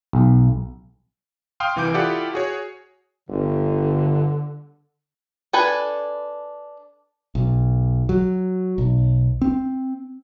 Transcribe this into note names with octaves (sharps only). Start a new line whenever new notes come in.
B1
F5 G5 C6 D#6 F6
C2 E3 G#5 D6 G6 D7
E4 F4 G4 A4 D5 F#5
F#4 G#4 C#5
G1 D3
D4 A4 B4 G#5
B1
F#3
B1
C4